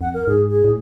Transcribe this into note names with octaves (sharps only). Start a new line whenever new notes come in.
F2 F#5
A#4
G#2 G#4
G#4
A2